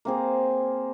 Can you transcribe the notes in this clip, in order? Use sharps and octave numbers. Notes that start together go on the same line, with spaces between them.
A#3 C4 G#4